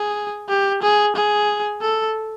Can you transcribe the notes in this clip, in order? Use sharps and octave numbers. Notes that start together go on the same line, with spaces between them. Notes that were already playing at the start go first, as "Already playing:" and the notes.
Already playing: G#4
G4
G#4
G#4
A4